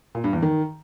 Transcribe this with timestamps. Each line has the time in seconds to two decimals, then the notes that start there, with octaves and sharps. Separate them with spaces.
0.15 A#2
0.24 G2
0.33 E2
0.42 D#3